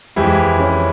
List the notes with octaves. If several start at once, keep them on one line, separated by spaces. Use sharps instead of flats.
F2 E3 G#3 E4 G4
C#4